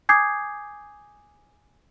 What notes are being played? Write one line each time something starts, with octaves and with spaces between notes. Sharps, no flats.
G#5 D6 D#6 G6 G#6 C7